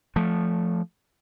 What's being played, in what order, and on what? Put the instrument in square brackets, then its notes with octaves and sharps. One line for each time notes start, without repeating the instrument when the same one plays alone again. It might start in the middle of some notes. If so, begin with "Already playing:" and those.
[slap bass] F3 A3